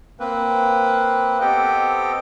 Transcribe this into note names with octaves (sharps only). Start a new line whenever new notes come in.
A#3 C4 B4
B3 C4 G4 A4 D#5 G5